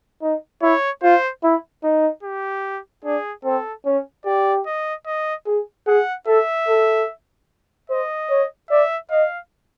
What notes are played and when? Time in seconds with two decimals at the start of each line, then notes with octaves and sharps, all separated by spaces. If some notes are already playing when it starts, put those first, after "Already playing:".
0.22 D#4
0.62 E4 C#5
1.03 F4 C5
1.44 E4
1.84 D#4
2.23 G4
3.05 D4 G#4
3.45 C4 A4
3.86 C#4
4.26 G4 D5
4.66 D#5
5.06 D#5
5.47 G#4
5.87 G#4 F#5
6.27 A4 E5
6.68 A4
7.90 C5 D#5
8.30 C#5
8.70 D5 E5
9.11 D#5 F5